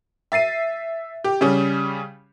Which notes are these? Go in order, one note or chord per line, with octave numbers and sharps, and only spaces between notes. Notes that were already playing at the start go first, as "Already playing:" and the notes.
E5 A6 C7 D#7
G4
C#3 G3 C#4